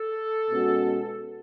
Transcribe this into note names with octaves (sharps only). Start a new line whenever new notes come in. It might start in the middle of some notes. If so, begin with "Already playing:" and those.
Already playing: A4
B2 G#3 C#4 F#4